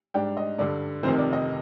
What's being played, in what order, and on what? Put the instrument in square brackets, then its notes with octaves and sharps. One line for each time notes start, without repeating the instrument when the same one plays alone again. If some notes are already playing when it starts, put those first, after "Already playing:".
[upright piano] G#2 G3 D4 G5
D#5
G2 D3 G3 D5
F1 F2 C3 D#3 C5
D5
D#5